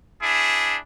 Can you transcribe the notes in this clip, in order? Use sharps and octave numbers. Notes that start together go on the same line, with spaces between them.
D4 E4 G#4